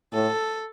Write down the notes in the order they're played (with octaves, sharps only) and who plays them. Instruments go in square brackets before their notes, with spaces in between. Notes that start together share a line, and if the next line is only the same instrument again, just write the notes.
[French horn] A2 [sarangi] A4